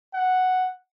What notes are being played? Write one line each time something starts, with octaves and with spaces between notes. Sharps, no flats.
F#5